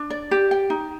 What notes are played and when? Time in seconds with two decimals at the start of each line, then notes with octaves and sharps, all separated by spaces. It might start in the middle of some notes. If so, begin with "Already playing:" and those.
Already playing: D4
0.10 D5
0.31 G4
0.51 G5
0.70 D#4